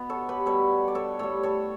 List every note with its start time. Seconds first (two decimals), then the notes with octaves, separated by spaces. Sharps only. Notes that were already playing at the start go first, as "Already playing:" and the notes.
Already playing: B2 B3
0.09 A4 C#5
0.29 G4 B4
0.46 B2 G3 A4 C#5
0.88 D5
0.95 A4 C#5
1.19 A2 G3 A4 C#5
1.43 A4 C#5